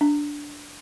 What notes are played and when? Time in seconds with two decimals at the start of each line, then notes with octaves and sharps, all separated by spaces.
0.01 D4